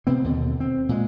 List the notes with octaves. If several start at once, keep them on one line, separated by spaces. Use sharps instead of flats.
C3 B3 C4
D#2 B2 D3
C4
A#2 G#3